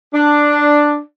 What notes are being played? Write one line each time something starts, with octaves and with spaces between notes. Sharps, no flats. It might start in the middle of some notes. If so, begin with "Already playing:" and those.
D4